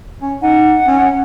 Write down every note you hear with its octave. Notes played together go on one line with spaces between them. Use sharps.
C#4
D#4 F#5
C#4